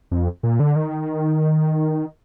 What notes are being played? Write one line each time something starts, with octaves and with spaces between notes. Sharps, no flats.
F2
A#2
D3
D#3